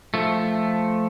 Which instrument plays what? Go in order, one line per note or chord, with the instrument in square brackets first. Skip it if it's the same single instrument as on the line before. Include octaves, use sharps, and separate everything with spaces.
[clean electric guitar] F3 A3